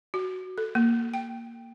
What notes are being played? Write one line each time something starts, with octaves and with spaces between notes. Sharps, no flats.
F#4
A4
A#3
G5